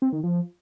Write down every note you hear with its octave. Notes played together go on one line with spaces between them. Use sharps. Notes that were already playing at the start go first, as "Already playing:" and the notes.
C4
D#3
F3